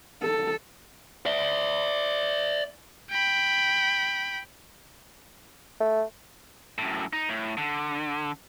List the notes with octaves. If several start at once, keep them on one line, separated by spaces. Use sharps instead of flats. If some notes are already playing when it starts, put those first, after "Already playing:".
A4
D5 E5
G5 B5
A3
F#2 A2
D#4
A2
D3